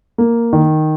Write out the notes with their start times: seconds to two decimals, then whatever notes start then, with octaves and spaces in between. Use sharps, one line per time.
0.18 A#3
0.53 D#3